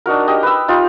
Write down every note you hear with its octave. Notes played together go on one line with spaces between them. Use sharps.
D4 D#4 F#4 A#4
G4 D#5
B4 E6
D#4 F4 G4